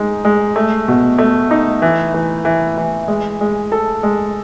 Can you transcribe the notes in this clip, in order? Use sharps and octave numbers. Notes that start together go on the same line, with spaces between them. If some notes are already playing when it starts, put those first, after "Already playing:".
Already playing: G#3 D#4
G#3
A3
B2
A3
D#4
E3
E3
E3
E3
G#3
G#3
A4
G#3